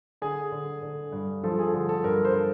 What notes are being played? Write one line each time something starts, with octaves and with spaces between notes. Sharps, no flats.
D3 G#4
D3
D3
G2
F3 A4
G#4
D3
A4
G2 A#4
C5